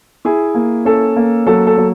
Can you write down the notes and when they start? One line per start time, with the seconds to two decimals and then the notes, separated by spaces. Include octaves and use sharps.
0.25 E4 G#4
0.55 A#3
0.85 C#4 A4
1.16 A#3
1.46 F#3 A4
1.67 A4
1.77 F#3